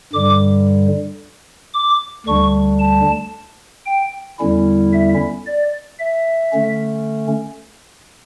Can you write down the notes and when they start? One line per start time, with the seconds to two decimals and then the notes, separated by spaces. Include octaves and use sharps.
0.13 G2 D3 G3 D6
1.74 D6
2.26 D2 D3 G3 D4 C#6
2.79 A5
3.86 G5
4.39 E2 D3 G3 C#4 E4
4.93 E5
5.46 D5
5.99 E5
6.53 D3 A3 C#4